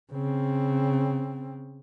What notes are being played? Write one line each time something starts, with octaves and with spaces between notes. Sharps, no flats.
C#3 C4